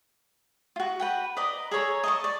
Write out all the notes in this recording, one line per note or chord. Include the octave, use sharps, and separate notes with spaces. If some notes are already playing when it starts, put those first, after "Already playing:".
F4 F#4
B4 F#5 G5
B4 D5 D#5 A#5
G#4 A4 C#5 A#5
D#5 A5 C#6
D5